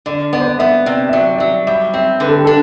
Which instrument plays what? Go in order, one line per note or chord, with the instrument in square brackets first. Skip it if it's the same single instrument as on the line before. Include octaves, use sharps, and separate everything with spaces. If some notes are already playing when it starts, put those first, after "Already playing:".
[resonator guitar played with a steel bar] D3 [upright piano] D5
[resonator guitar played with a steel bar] B3 [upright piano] D5
[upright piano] C5
D5
[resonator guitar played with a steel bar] B3 [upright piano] E5
[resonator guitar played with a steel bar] C3 [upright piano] D5
[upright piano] E5
[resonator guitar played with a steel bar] F#3 [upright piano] D5
[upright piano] D5
[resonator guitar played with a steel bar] F#3 [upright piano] E5
[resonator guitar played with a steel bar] G3 [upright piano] E5
[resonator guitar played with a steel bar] C4 [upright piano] E5
[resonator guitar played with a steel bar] D3 [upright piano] B4
[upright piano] A4
G4
[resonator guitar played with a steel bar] D4 [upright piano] A4